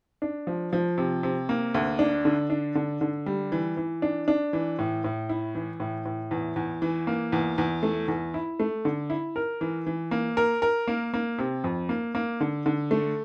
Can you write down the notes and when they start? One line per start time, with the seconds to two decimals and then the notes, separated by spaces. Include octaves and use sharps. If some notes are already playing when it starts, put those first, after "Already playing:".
0.22 D4
0.47 F3
0.73 F3
0.98 C3
1.23 C3
1.49 A#3
1.74 D2
1.99 D4
2.25 D3
2.50 D4
2.75 D3
3.01 D3
3.26 G3
3.52 E3
3.77 E3
4.02 D4
4.28 D4
4.53 E3
4.79 A2
5.04 A2
5.29 E4
5.55 E3
5.80 A2
6.05 A2
6.31 E2
6.56 E2
6.82 E3
7.07 A#3
7.32 E2
7.58 E2
7.83 A3
8.08 E2
8.34 E4
8.60 A3
8.85 D3
9.10 E4
9.36 A#4
9.61 E3
9.86 E3
10.11 A#3
10.37 A#4
10.62 A#4
10.88 A#3
11.14 A#3
11.38 C3
11.64 F2
11.89 A#3
12.15 A#3
12.40 D3
12.66 D3
12.91 A3